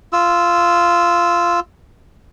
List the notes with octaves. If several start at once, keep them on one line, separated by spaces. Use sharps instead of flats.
F4 E6